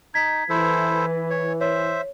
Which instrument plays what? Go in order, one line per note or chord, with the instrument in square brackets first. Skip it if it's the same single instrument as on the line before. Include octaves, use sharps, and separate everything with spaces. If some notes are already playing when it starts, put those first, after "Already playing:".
[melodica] D#4 [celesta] G#6 B6
[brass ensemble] E3 [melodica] E4 A4 C5
[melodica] C#5
[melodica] C5 E5 [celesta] C#5